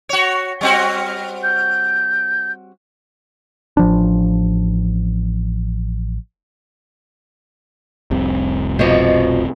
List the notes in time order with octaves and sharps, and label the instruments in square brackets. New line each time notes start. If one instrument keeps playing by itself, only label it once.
[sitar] F#4 C#5
G3 C4 F#4
[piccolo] G6
[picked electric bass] A1 F3 D4
F1 C2 C3
[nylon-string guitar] B2 F3 [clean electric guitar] C5 C#5 D#5